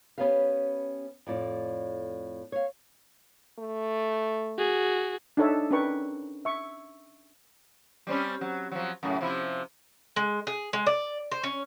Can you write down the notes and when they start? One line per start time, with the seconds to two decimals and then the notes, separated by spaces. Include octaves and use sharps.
0.18 B3 C#4 G4 B4 F5
1.27 F2 A2 D5
2.52 C#5 F5
3.60 A3
4.58 F#4 G#4
5.37 D4 D#4 A4 C#5 E5
5.71 C#4 D4 A#4 B4 G5 C#6
6.45 E5 C#6
8.07 G3 C4 C#4
8.41 F#3
8.72 F3 F#3
9.03 F#2 A2 C#3
9.21 C3 F3 E4
10.16 G#3
10.47 G#4
10.73 G#3
10.86 D5
11.31 C5
11.43 C#4